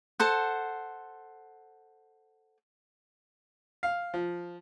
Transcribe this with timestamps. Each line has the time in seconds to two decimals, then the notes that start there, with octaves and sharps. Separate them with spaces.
0.20 A4 C5 F#5
3.83 F5
4.14 F3